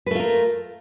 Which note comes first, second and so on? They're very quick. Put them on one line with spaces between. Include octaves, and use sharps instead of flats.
B4 A3 F4 A#4